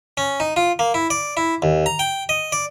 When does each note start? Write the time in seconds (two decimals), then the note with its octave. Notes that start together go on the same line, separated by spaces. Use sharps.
0.17 C#4
0.40 D#4
0.56 F4
0.79 A#3
0.94 E4
1.10 D5
1.37 E4
1.62 D#2
1.86 A#5
1.99 G5
2.29 D#5
2.52 D5